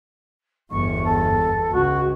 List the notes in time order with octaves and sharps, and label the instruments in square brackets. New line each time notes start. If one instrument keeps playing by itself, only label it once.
[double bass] G1 E2 [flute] C#6
[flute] A4
[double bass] C#2 [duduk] F#4